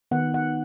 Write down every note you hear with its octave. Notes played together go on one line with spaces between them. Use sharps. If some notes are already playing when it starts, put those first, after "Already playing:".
D#3 B3 F#5
F#5